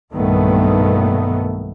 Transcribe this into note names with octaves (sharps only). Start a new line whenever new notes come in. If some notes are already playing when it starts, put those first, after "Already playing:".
B1 G2 A#2 D#3 A3 B3